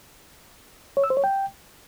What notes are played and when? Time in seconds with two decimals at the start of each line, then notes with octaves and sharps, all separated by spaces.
0.97 C#5
1.04 E6
1.10 C5
1.17 C#5
1.24 G5